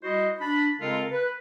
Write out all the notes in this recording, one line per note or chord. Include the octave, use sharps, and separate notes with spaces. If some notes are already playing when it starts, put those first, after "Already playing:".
G3 E4 F#4 C5 D#5
D4 B5
C#3 G#3 C4 F4 A4 A#4
B4